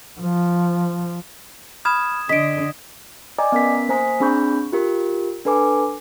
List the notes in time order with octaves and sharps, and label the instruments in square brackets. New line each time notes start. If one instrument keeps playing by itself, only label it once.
[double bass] F3
[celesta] B5 F6 [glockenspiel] D#6 G#6 E7
[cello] D3 [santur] D#5 [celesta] B6 D7
[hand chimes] D5 D#5 G5 G#5 A#5 D6
B3 C#4 A#4 B6
A#3 C5 G#5 A#5 D#6 B6
C4 D4 G#4 B5 C#6 G6
F4 G4 A#4
D4 A4 B4 G#5 D6